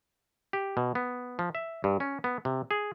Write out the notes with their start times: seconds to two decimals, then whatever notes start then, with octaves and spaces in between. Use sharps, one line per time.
0.53 G4
0.77 B2
0.95 B3
1.39 F3
1.55 E5
1.84 G2
2.00 C#4
2.24 B3
2.45 C3
2.71 G#4